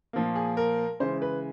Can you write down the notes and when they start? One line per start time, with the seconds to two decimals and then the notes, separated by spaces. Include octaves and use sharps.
0.13 A#2 F3 A#3
0.35 G#4
0.57 A#4
1.00 C#3 E3 G#3 C5
1.22 B4